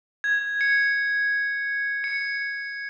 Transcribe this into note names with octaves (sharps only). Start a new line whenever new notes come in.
G#6
C#7
C#7